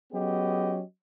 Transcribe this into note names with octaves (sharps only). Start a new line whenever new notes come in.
F#3 B3 C#4 G4 G#4 D#5